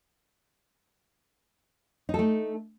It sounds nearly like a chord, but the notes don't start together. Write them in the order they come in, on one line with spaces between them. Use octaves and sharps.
D#4 A4 A3